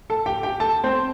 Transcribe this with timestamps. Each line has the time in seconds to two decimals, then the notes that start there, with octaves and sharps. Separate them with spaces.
0.10 A4 A5
0.26 G4 G5
0.43 G4 G5
0.60 A4 A5
0.84 C4 C5